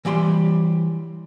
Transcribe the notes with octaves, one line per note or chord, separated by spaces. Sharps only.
E3 G3 G4 B5 C6